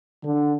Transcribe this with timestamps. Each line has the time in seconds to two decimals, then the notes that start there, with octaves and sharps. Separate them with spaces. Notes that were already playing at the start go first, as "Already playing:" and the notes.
0.24 D3